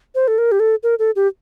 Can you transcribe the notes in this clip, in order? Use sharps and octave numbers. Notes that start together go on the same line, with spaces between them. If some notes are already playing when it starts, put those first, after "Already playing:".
C5
A4
A#4
G4
A4
A#4
A4
G4